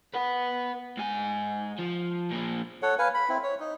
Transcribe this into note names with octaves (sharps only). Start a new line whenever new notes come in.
B4 F#5
G#2 G#5
F3
A#2 F3
A4 C#5 F#5
B4 F5 G#5
B5
C4 E4
C#5
D#4